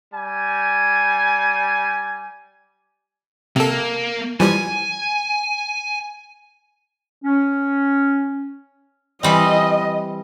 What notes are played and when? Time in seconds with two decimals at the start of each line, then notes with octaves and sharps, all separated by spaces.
0.14 G3 G#5
3.56 C3 A#3 A4
4.40 E3 F3 G3 G#5
7.23 C#4
9.23 E3 G3 C4 D#5